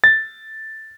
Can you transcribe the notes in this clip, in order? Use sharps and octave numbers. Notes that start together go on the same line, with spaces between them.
A6